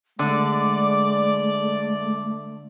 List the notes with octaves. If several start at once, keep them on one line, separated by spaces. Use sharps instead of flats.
D3 G#3 A3 D5